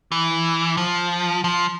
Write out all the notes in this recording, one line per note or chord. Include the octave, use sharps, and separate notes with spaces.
E3
F3
F3